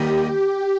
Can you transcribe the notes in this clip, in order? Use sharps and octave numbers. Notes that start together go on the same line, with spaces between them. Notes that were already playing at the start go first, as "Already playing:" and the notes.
Already playing: D#2 D#3 G3 B3 D#4 G4